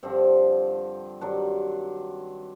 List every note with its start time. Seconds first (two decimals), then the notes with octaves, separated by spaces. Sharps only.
0.03 G2 D3 F3 C4
1.21 G2 D#3 F#3 D4